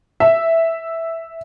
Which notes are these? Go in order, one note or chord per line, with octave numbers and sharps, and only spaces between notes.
E5